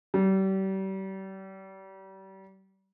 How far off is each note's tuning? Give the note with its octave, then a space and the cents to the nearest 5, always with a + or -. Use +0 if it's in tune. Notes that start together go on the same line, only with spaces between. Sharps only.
G3 -35